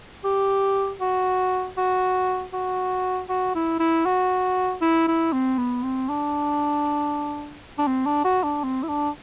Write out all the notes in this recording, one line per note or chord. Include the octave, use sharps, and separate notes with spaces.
G4
F#4
F#4
F#4
F#4
E4
E4
F#4
E4
E4
C4
B3
C4
D4
D4
C4
D4
F#4
D4
C4
E4
D4